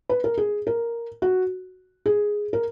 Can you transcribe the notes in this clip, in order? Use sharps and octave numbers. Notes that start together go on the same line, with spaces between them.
B4
A#4
G#4
A#4
F#4
G#4
A#4